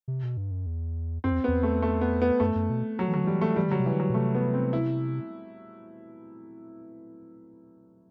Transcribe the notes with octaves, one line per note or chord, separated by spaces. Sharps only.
C3
B2
G2
F#2
E2
F#2 C4
E2
E2 B3
A3
A3
B3
B3
F#2 A3
F#2
B2
F#3
E3
D3 F#3
E3 G3
A3
E3 G3
D3 F#3
C3
E3
D3
F#3
B2
C3 A3
B3
C4
E4